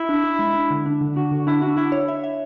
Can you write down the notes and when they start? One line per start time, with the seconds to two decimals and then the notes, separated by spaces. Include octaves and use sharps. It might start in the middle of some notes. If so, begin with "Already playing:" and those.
Already playing: E4
0.09 D4
0.24 D4
0.39 G#3
0.54 D4
0.71 D3
0.86 D4
1.01 D3
1.16 D4 F#4
1.31 D3 F#4
1.47 D4 E4
1.61 D4 F#4
1.77 D4 E4
1.92 C#5
2.08 E5
2.24 E5